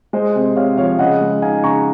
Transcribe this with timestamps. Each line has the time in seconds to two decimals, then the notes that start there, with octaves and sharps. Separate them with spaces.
0.13 G#3 C5 D#5
0.35 C3
0.57 C3 C#5 F5
0.77 F3 C#5 F5
0.99 C#3 D#5 F#5
1.21 G#3
1.42 D#4 F5 G#5
1.64 C#3 A#5 C#6